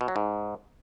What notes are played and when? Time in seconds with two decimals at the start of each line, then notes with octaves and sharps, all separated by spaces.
0.01 B2
0.08 F#3
0.16 G#2